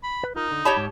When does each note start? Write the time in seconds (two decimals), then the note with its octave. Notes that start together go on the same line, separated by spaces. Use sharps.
0.03 B5
0.23 B4
0.36 D#4 F4 A#4
0.51 D3
0.65 G4 C#5 A5 B5
0.77 G#2